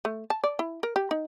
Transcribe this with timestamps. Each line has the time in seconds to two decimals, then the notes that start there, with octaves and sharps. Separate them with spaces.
0.05 A3
0.30 A5
0.44 D5
0.59 E4
0.83 A#4
0.96 G4
1.11 D#4